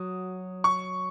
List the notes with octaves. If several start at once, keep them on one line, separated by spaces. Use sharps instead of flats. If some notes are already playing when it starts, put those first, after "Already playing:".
Already playing: F#3 F#4 D#6
C#6